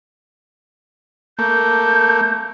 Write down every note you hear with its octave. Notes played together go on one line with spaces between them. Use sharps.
A3 A#3 G6